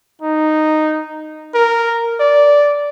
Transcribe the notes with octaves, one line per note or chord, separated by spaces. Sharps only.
D#4
A#4
D5